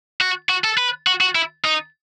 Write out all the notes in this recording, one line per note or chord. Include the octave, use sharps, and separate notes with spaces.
F#4
F#4
A4
B4
F#4
F#4
E4
D#4